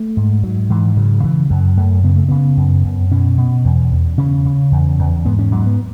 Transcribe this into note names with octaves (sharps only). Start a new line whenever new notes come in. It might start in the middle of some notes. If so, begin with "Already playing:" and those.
Already playing: A3
G#2
G#2 F#3
G#2 E3
C#3 F#3
C#3 E3
F#2 F#3
F#2 A3
C#3 B3
A3
C#3 B3
F#2
F#2
B2 C#4
B2
E2
E2
C#3 C#4
C#3
E2
E2
G#2 B3
C#4
G#2 F#3
B3